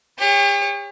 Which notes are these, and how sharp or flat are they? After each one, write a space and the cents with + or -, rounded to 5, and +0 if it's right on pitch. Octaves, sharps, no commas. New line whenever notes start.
G4 +45 C#5 +0